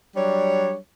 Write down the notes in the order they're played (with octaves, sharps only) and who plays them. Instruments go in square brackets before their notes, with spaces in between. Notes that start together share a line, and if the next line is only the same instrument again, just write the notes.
[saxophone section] F#3 G3 D4 C#5